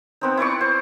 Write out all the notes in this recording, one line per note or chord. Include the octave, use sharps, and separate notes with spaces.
B3 C4 D#4
E4 B4 D5 C#6
C5